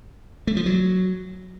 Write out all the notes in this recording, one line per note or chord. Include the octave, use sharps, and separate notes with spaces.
A3
F3
F#3